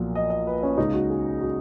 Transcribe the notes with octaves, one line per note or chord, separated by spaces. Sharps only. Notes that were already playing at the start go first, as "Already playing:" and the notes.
Already playing: B1 A#2 F3
D#5
D#5
B4
C#4
C#2 C#3 G#3 D#4
F#4
G#4
F#4